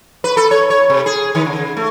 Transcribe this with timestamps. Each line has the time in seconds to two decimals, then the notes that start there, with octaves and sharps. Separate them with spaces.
0.24 B4
0.37 A4
0.51 C#5
0.70 C#5
0.90 C3
1.06 G#4
1.35 D#3
1.46 C#3
1.77 A3